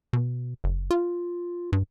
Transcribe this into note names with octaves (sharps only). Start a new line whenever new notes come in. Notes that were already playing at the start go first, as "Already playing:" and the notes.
B2
F#1
F4
G2